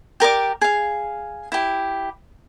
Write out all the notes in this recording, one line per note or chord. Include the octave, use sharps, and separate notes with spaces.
G4 A#4 D5 D6
G#4 F5
E4 G4